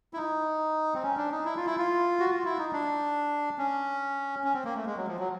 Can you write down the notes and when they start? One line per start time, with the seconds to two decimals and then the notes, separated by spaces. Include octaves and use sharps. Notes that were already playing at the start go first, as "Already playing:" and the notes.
0.14 E4
0.17 D#4
0.94 C4
1.03 C#4
1.17 D4
1.31 D#4
1.45 E4
1.57 F4
1.66 E4
1.78 F4
2.19 F#4
2.30 F4
2.45 E4
2.58 D#4
2.73 D4
3.58 C#4
4.44 C#4
4.54 C4
4.64 A#3
4.76 A3
4.86 G#3
4.97 F#3
5.07 F3
5.19 F#3